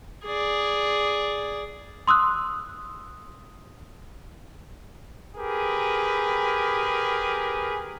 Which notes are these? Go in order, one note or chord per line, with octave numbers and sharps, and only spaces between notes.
G#4 D5
C6 D#6 E6 F#6
G4 G#4 A#4 B4